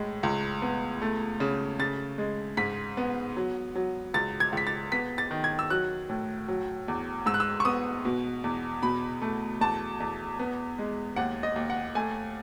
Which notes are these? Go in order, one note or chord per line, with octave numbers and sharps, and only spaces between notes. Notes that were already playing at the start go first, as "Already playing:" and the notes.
Already playing: A2 G#3
C#2
B3
A3
C#3
C#3 A6
G#3
G#2 B6
B3
F#3
F#3
C#2 A6
G#6
C#2 B6
A6
B3 B6
A6
D#3
G#6
E6
F#3 F#6
A2
F#3
E2
G#2 E6
F#6
E6
C#6
B3 D#6
B2
E2
B2 B5
A3
E2 A5
E2
B3
G#3
D#2 F#5
D#5
D#2
F#5
A3 G#5